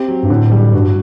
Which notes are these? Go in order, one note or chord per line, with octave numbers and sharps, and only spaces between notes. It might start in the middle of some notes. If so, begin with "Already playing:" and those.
Already playing: C4 G4
F#3
G2
A2 D3
G3
G2 F#4